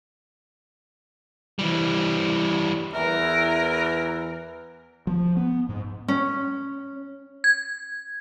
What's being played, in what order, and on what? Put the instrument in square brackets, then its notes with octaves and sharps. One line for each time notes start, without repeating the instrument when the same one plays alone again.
[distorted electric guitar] E3 G3
[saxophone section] E2 E3 [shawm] A#4
[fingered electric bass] F3
B3
G#2
[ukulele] C#4
[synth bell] G#6